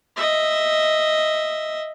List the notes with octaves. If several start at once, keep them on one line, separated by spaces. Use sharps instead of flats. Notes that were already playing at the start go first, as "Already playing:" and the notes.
D#5 E5